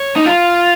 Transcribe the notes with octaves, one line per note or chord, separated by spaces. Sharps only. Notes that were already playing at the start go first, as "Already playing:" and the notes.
Already playing: C#5
D#4
F4